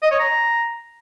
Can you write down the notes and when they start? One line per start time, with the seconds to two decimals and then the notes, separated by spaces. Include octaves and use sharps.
0.03 D#5
0.11 C#5
0.20 A#5